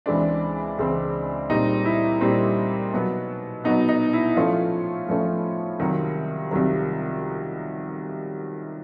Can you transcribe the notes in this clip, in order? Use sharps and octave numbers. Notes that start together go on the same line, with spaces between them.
C#2 C#3 E3 G#3 C4 D4
C#2 C#3 E3 G#3 C4
A#2 G3 C4 D#4
E4
A#2 G3 C4
B2 F#3 B3
B2 F#3 B3 D#4
D#4
E4
A2 F3 A3 C#4 F4
A2 F3 A3 C#4
C2 C3 D#3 F#3
C2 C3 D#3 F#3